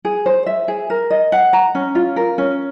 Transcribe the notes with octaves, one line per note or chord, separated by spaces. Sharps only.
G#4
C5
E5
G#4
A#4
D#5
F#5
A#5
C#4
F4
A#4
C#4